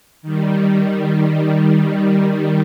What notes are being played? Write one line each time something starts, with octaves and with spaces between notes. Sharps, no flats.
D#3 G3